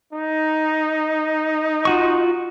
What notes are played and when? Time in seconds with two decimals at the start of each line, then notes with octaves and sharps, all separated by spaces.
0.13 D#4
1.85 F4 F#4 C#6